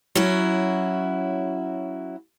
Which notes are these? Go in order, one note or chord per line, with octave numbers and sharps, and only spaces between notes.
F#3 C#4 E4 F#4